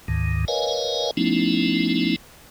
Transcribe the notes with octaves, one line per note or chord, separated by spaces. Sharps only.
D2 G#2 D#3
A#4 B4 C#5 D#5 F5 G#5
F3 A3 B3 C#4 D#4 E4